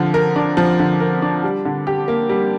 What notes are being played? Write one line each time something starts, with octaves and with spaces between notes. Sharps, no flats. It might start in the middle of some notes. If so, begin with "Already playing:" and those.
Already playing: D3 F3
A#4
D4
F3
D3
A#4
D4
G3
D3
G4
A#3
G3